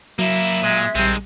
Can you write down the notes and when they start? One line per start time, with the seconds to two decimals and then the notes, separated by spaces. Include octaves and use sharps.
0.19 F#3 A#3 E4 E5
0.63 A#2 G#3
0.95 A#1 D#3 G3 G#3 C4